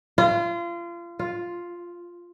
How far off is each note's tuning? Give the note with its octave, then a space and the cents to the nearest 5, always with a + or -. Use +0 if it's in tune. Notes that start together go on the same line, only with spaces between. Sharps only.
F4 -30
F4 +0